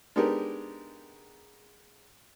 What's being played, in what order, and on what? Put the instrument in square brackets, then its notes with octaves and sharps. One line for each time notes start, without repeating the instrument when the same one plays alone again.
[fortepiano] G#3 B3 D4 D#4 G4 A#4